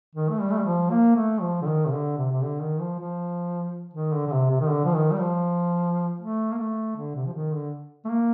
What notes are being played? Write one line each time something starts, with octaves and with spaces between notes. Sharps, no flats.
D#3
A3
G3
A3
G3
F3
A#3
A3
F3
D3
D#3
C3
D3
C3
C3
D3
D#3
F3
F3
D#3
D3
D3
C3
C3
D#3
D3
F3
D#3
G3
F3
A3
A#3
A3
D3
C3
F3
D#3
D3
A3
A#3